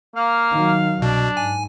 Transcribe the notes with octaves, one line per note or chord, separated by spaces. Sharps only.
A#3 F5
D#3 F#3
C2 B2 D4
G#2 G#5